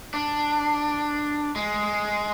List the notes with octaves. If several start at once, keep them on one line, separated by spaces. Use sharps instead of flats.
D4
G#3